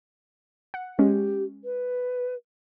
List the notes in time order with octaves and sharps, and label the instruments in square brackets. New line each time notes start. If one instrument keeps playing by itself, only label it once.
[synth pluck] F#5
[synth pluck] G#3 C#4 [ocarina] G4
[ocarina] B4